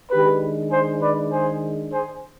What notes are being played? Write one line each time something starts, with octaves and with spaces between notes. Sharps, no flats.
D#3 G#3 D4 G4 B4
G#4 C5
B4 D5
G#4 C5
G#4 C5